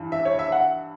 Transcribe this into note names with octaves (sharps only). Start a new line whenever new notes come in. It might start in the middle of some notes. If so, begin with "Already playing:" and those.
Already playing: G2 E3
E5
C#5
E5
F#5